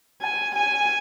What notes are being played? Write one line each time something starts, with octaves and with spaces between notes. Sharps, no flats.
G#5
G#5